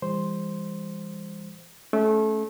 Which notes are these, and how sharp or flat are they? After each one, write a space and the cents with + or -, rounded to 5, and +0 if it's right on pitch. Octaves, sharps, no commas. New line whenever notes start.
E3 +20 G3 +45 C5 +0
A3 -25 C#4 +0